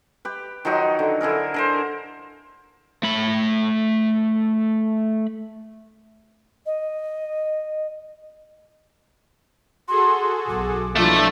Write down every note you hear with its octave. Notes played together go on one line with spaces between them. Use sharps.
G4 B4
D#3 F3 F#3 D#4
D3
D3 E4 G#4 A#4
D3 A#4 C5
A3 B5
D#5
F#4 G#4 A4 C6
B1 D6
B2 F3 F#3 A3 D4 E4 F4 A4